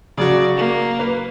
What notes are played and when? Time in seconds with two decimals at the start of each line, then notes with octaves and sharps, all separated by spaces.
0.18 C#3 F#3 F#4 D5
0.58 A#3
0.99 B4